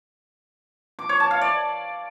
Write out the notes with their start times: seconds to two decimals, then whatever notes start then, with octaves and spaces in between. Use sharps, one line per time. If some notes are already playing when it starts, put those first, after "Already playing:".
0.99 D6
1.09 C#5
1.20 A5
1.31 F5
1.41 D5